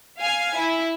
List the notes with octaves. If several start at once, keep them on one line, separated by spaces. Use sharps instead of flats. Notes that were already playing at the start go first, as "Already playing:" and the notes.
F5 G#5
E4